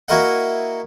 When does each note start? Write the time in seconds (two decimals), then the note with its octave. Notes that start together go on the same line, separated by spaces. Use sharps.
0.08 A#3 E4 F#4 A#4 D#5 F#5